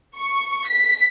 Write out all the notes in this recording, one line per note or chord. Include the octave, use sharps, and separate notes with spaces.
C#6
B6